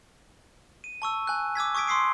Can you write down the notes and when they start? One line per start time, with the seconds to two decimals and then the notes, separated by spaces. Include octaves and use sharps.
0.84 D#7
1.02 A5 C#6 E6
1.27 G#5 F#6
1.55 D6 E6 G#6 B6
1.75 C#6 D#6 G#6 B6 D7
1.87 C6 D#6 B6 C7 D7